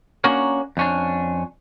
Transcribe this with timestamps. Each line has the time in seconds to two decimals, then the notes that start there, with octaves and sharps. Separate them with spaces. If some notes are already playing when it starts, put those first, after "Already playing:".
0.24 A#3 C#4 D4 F#4 A#4 C#5
0.77 F2 C#4 D4